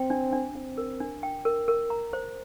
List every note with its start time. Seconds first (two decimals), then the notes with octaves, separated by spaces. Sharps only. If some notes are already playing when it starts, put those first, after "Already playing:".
Already playing: C4 G5
0.10 D4
0.33 D4
0.55 C4 D4
0.78 A#4
1.00 D4
1.23 G5
1.45 A#4
1.68 A#4
1.90 A#5
2.13 C5